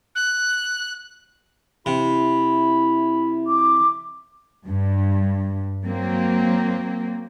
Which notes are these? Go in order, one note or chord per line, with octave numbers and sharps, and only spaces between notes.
F#6
C3 E4 B5
D6
G2
F#3 A#3 C4